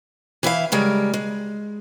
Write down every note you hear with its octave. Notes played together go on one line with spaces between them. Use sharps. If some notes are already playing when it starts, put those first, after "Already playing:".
E3 E4 E5 F5
C#3 G3 G#3 A#4
G#3